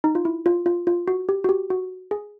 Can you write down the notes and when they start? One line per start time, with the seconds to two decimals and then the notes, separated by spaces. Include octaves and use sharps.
0.04 D#4
0.15 F4
0.25 E4
0.46 F4
0.66 F4
0.87 F4
1.08 F#4
1.29 G4
1.44 F#4
1.49 G4
1.70 F#4
2.11 G#4